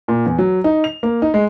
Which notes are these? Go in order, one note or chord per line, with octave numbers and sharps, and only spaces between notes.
A#2
E2
F#3
D#4
F7
A#3
D#4
G#3